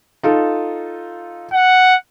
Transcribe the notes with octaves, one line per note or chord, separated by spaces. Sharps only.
D#4 F4 A4
F#5